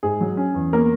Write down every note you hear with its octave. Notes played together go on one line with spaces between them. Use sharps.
G#2 G#4
F#3
C#4
E2
A#3 B3 A#4